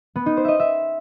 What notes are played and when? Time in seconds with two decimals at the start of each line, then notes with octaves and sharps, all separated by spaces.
0.16 B3
0.26 D#4
0.37 C5
0.45 D#5 E5
0.59 E5